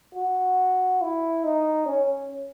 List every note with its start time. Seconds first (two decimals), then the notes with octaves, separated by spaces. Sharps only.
0.15 F#4
1.02 E4
1.44 D#4
1.86 C#4